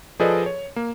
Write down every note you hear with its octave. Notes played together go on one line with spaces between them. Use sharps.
F3 G#4 A4 B4 D5 D#5
C#5
A#3